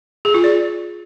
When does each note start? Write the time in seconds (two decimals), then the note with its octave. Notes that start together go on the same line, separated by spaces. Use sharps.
0.25 G#4
0.34 F4
0.44 D5